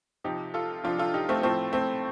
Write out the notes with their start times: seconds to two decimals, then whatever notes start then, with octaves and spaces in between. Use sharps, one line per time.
0.24 C3 F3 D#4 G4
0.54 F4 A4
0.83 C3 F3 D4 F4
0.98 F4 A4
1.14 D#4 G4
1.29 A3 C4
1.43 A2 F3 A3 C4
1.73 A3 C4